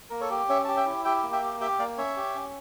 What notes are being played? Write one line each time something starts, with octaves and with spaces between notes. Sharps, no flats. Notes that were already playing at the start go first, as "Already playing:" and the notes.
A#3 A#4
A4 C#5
G4
C#4 C#5 E5
G4 A5
E5 G5
E4
G4 E5 G5
A#3
E5 G5
G4
G4 E5 G5
A#3 D5 F5
C#4 C#5 E5
G4
C#4